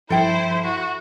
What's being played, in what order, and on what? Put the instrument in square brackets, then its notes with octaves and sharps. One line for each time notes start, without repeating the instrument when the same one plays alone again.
[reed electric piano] G2 F3 [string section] E4 [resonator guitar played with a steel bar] A4 G5 [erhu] C5
[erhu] F#4